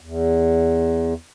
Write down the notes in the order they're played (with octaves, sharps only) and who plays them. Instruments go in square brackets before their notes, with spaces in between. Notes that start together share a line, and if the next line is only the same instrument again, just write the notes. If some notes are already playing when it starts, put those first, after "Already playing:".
[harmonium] E2